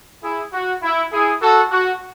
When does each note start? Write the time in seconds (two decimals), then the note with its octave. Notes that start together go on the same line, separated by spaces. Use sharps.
0.23 E4 G#4
0.53 F#4
0.82 E4
1.12 E4 G#4
1.42 F#4 A4
1.71 F#4